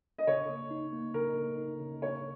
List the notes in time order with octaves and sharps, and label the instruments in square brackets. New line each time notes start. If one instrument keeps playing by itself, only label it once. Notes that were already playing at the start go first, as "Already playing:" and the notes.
[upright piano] D#5
[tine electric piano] C#3 [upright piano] C#5
[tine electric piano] A#3
D#4
A#3
[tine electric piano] C#3 [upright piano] A#4
[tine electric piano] A#3
D#4
C#3
[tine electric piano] A#3 [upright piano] C#5